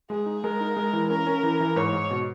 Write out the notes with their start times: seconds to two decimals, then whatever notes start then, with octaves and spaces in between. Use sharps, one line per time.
0.10 G#3 G#4
0.26 D#4
0.43 G#3 A#4
0.61 D#4
0.77 G#3
0.93 E3
1.10 C#4 A#4
1.26 C#4
1.43 E3
1.60 E3
1.76 G#2 C#5
1.93 G#2
2.11 B2